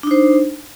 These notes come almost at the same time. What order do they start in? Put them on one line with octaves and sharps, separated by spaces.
D4 D#4 C5